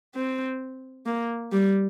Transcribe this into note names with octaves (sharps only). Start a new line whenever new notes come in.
C4
A#3
G3